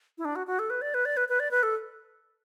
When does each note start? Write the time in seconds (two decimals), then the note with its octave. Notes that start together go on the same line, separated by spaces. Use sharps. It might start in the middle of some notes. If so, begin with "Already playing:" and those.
0.18 E4
0.25 D4
0.35 F#4
0.47 F#4
0.59 A4
0.70 B4
0.81 D5
0.94 B4
1.05 D5
1.17 B4
1.29 B4
1.40 D5
1.51 B4
1.63 A4